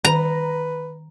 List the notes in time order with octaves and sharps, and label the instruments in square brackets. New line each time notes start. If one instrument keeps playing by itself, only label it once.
[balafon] D#3 [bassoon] B4 [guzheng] A#5